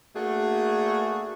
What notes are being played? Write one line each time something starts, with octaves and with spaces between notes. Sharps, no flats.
A3 A#3 D4 F#4 G#4